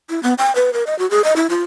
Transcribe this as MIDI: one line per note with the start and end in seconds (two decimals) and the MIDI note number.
0.10 0.22 64
0.23 0.34 59
0.38 0.54 79
0.55 0.71 71
0.73 0.84 70
0.87 0.97 75
0.99 1.09 66
1.11 1.24 68
1.24 1.34 75
1.36 1.47 64
1.50 1.63 65